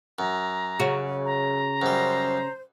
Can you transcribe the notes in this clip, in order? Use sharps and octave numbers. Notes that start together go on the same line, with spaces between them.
F#2 A#5
C#3 F#4
A#5
F#2 G3 C5